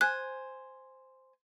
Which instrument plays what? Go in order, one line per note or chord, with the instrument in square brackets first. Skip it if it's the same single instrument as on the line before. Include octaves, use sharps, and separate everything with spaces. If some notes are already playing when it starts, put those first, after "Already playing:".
[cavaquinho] C5 G#5 [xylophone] F#6